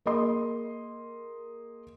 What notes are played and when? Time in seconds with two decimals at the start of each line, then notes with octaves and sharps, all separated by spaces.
0.06 A#3 G#4 D#5 C6